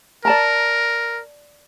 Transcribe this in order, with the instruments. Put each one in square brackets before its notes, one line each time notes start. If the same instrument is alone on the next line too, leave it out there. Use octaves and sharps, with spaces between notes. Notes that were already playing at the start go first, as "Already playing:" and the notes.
[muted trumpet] A#4 [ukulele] D5 A5 A#5